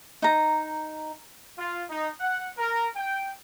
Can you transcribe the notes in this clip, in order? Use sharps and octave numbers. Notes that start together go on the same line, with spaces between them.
D#4 A#5
F4
D#4
F#5
A#4
G5